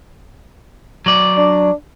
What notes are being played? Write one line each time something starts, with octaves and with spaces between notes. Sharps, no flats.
F#3 D5
D4